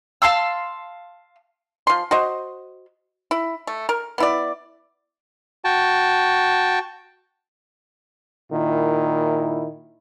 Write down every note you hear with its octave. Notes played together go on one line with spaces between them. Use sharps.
F5 A5 C6 E6
F3 C6
F#4 C5 D#5
E4
A3
A#4
B3 E4 D5
F#4 G5 A5
A#2 D#3 E4